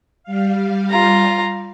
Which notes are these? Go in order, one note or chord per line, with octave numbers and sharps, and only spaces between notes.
G3 F5
F4 A#5